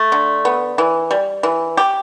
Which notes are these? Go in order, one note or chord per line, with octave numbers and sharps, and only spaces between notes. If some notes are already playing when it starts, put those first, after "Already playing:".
Already playing: A3
D3
B3
E3
G3
E3
G4